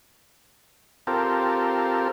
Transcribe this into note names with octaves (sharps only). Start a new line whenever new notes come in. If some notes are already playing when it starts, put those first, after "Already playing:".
C4 F4 G4 A4 A#4